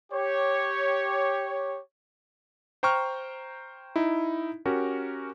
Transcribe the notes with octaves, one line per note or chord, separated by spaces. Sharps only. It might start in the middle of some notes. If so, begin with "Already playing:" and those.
G4 C#5
C5 G5 A#5 C#6 F6
D#4 E4
C#4 F#4 G4 A#4